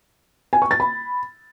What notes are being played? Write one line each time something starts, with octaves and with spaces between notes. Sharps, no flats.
G#5
C#6
A6
B5